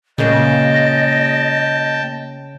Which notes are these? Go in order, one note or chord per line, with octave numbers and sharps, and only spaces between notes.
A#2 C#3 G#3 A#3 D#5 G5 A5